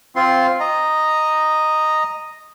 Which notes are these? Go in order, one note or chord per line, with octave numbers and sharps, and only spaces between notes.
C4 F4 C6
D#5 A#5